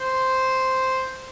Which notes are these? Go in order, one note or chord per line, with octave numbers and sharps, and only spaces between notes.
C5